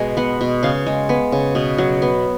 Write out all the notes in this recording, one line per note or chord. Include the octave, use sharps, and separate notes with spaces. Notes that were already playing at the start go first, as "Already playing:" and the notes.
Already playing: B2 G#3
B3 F#5
B2
C#3 F5
G#3
B3
C#3
B2
F#3
B3